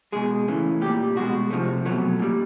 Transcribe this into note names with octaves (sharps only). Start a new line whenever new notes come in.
B2 G#3 G#4
C#3 E3 A3
A#2 G3 G4
B2 G#3 F#4
C3 F3 A3
B2 F#3 A3
A#2 G3